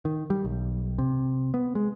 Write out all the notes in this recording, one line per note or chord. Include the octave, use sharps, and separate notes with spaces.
D#3
G3
B1
C3
B3
G#3